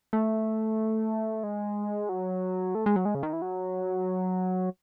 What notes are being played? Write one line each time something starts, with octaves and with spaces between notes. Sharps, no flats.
A3
G#3
F#3
A3
G#3
F#3
G#3
C#3
D#3
E3
F#3